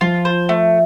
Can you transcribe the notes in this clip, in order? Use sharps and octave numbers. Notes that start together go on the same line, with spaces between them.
F3 F4
C5
A3